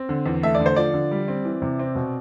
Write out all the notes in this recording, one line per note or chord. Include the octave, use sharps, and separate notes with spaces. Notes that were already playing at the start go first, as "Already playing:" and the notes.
Already playing: C4
D3
E2
A3 E5
D5
D3
C5
F3 D5
D3
G3
C4
E3
C3
C4
B2